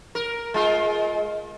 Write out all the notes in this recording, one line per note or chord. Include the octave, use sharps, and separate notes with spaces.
A#4
G#3 F4